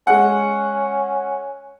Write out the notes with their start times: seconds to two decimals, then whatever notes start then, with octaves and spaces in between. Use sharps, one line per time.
0.07 G#3 C#4 F#5